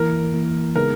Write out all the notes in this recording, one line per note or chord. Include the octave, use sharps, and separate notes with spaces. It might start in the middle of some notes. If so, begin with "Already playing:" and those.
Already playing: E3 A#3 E4 A#4
E3 A#3 E4
C#3 G#3 B3 D#4 G#4 A#4